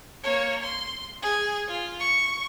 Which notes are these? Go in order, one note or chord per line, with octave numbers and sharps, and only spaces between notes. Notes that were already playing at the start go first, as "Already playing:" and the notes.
A#3 C#5
C6
G#4
F4
C#6